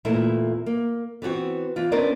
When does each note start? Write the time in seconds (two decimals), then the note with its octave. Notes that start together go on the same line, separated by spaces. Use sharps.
0.05 E2 A#2 A3 E4
0.66 A#3
1.22 E3 B3 C4 F#4
1.76 E2 F4
1.92 B3 C#4 D4 A#4 C5 D5